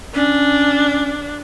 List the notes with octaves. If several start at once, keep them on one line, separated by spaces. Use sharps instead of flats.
C#4 D4